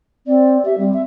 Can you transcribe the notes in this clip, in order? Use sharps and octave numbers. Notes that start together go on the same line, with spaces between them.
C4 D5
G4 E5
G3 C4
E5